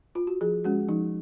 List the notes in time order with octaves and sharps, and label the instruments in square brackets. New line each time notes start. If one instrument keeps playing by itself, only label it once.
[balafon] F4
F#4
F3 G#4
G#3 C#4 F#4
F3 D#4